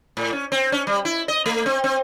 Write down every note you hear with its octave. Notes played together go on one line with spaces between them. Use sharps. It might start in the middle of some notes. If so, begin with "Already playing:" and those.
A2
C#4
C4
C#4
G3
E4
D#5
A3
C4
C4